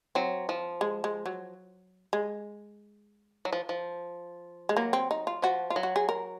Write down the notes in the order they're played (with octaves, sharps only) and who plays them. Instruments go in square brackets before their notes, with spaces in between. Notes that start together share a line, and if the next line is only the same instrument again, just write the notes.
[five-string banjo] F#3 [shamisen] C4
[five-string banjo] F3
[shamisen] G#3
G#3
F#3
G#3
[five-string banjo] F#3
F3
F3
[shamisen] G#3
[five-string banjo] F#3 [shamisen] A#3
[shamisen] C4
D#4
F4
[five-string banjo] F3 [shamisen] F#4
[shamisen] F4
[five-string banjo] F#3
[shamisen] F#4
G#4
A#4